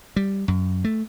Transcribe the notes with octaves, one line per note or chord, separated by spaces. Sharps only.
G3
F#2
A3